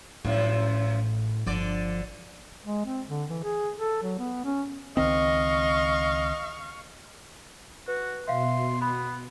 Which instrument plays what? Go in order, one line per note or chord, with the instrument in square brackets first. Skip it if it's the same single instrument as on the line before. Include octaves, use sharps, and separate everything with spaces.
[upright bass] A1 [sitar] F#2 F3 [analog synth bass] A2
[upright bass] G1 [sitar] D3 D5 [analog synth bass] F3
[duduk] G#3
C4
D3
E3
G#4
A4
F#3
B3
C#4
[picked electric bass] C#2 D#3 C4 [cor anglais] D#5 [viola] F5 C#6
[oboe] F#4 [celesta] B4
[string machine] B2 [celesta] E5 F5 [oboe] C6
[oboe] B3 [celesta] B5